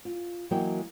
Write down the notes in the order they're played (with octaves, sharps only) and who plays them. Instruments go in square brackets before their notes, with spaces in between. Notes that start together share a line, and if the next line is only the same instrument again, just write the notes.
[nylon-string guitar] F4
E3 F#3 A#3 A#4 D#5 G5